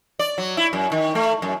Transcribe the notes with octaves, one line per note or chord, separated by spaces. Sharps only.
D5
F#3
E4
F#2
D#3
A3
F#2